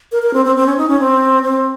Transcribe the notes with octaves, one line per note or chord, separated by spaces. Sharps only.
A#4
A#4
C4
C4
C4
C#4
D#4
C#4
C4
C4